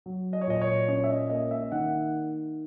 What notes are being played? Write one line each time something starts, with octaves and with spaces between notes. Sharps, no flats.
F#3
D#5
C#5
A#2 D#5
C#5
C#4 C#5
E5
D#5
A#3 D#5
E5
D#3 F#5